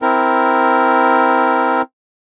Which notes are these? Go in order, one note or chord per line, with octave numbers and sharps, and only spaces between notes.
C4 E4 A#4